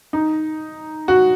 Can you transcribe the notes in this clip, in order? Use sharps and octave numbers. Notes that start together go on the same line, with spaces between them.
D#4
F#4